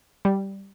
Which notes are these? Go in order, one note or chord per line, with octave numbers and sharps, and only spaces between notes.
G3